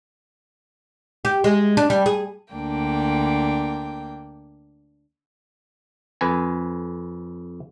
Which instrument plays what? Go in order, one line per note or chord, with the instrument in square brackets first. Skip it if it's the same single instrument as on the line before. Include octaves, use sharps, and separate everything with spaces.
[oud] G4
G#3
D4
G3
G#4
[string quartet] D2 A#3 D4 G5
[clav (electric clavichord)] F2 B4 G#5